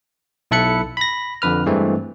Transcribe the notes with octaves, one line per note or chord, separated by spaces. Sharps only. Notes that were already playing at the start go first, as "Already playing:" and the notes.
B1 E4 A4 B5 F#6 C#7
B5 A#6
F2 D3 B4 F6
G2 E3 G#3 A3 C4